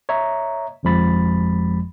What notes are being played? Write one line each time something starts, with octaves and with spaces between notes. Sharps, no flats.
C#5 D#5 E5 A#5
G1 F2 F3 G#3 B5 A6